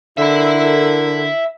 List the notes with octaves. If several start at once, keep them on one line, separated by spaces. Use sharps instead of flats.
D3 E4 A4 A#4 E5 B5